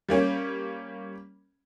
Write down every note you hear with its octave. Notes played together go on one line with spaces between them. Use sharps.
G3 A#3 C#4